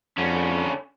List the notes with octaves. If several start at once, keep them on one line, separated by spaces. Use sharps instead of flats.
F2 D3 C#4